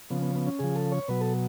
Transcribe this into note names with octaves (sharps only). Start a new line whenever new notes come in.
C#3 F3 B3
B3
B3
C#4
C#3 F3 G#4
A4
C#5
B2 F#3 B4
A4